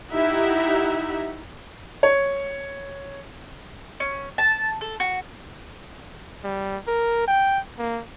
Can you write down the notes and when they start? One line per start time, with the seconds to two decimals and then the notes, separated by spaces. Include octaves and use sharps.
0.12 D#4 E4 G4 E5 F#5 A#5
2.03 C#5
4.00 C#4
4.38 A5
4.81 A4
5.00 F#4
6.44 G3
6.87 A#4
7.28 G5
7.78 A#3